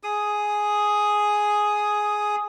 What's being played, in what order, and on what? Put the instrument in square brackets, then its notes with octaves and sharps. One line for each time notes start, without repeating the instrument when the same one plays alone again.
[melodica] G#4 D#6